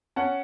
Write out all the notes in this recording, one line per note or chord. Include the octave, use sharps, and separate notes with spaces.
C#4 F#5 A5